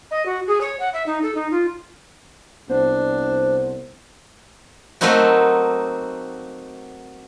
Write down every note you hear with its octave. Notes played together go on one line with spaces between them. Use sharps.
D#5
F#4
G#4
C#5
F#5
E5
D#4
A4
D#4
F4
C2 B3 D4 C5
F#3 A3 A#3 C4 D#4 F#4